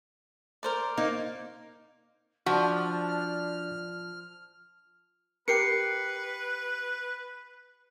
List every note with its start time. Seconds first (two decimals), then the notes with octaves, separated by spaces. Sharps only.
0.63 A#4 C5 D5
0.97 A#3 D#4
2.46 F3 D4 F#4 F6
5.48 G4 A#4 B4 C7 C#7